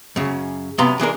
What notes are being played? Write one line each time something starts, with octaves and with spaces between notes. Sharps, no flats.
F#2 C#3
F#2 C3 B3 F5 A#5 C6
E3 G#3 D4 A#4